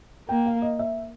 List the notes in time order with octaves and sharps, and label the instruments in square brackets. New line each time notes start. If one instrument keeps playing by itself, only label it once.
[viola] A#3 [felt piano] G5
[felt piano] F5
D#5
E5